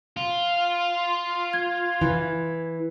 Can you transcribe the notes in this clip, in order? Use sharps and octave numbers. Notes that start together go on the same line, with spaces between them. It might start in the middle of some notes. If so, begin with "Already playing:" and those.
F4
G#6
E3